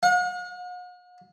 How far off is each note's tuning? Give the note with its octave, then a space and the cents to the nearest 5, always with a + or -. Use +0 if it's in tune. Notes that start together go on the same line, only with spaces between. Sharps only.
F#5 -45